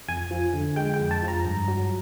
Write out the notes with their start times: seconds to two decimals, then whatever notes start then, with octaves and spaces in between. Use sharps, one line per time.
0.08 F2 G#5
0.31 F3
0.53 D3
0.76 G#3 G5
0.94 G5
1.00 F2
1.11 A5
1.22 F3
1.28 A#5
1.45 G2
1.68 F#3